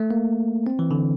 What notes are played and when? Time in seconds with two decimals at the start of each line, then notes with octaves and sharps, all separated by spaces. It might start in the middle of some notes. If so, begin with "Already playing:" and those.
Already playing: A3
0.11 A#3
0.67 C4
0.79 E3
0.91 D3